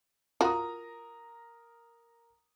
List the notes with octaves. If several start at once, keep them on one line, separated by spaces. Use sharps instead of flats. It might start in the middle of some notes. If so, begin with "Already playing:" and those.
F4 F#4 A#4 A#5 D#6